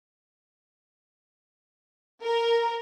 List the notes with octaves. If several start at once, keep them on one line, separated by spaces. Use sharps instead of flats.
A#4